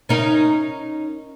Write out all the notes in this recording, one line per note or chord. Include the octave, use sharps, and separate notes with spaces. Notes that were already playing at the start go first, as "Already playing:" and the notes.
C#4 D#4 A#4